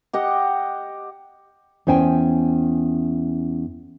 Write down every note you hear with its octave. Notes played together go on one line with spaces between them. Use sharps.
G4 D#5 F#5
E2 C#4 C5 G5 G#5